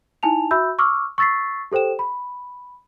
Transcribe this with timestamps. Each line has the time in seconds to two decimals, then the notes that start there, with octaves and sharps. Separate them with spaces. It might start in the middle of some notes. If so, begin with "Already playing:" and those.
0.23 D#4 E4 G#5 A5 F7
0.51 F#4 E5 B5 E6 G6
0.79 C#6 D6 E6 F6
1.18 C#6 E6 A6 B6 C7
1.72 G4 A4 C5 G5 E7
1.99 B5